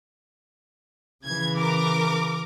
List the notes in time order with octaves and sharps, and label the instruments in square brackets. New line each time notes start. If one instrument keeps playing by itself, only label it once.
[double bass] C#3 E3 [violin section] G#6
[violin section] A#4 D6